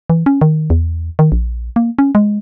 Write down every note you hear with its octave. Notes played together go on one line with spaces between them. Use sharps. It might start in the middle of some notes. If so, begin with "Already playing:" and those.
E3
C#4
D#3
E2
D#3
A#1
A#3
C#4
G#3